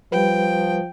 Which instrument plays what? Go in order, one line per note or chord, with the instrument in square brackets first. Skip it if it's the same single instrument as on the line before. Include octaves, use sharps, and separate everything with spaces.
[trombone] F3 [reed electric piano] G3 B4 [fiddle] G5